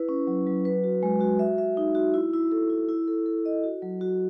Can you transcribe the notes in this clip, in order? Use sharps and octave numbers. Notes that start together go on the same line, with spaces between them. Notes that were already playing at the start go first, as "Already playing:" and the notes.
Already playing: E4 B4
C#4
F#3
F#3
B4
F#4
G#3
F#4
E5
E5
D#4
F#4
E4
E4
A4
E4
E4
A4
A4
D#5
F#4
F#3
F#4